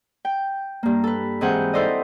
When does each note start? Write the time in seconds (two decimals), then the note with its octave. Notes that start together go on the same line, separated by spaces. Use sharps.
0.25 G5
0.83 G2 A#3
1.04 A4 B4
1.41 G#2 E3 C4 G#4 F#5 G6
1.73 D#4 E4 A4 C5 D5 D#5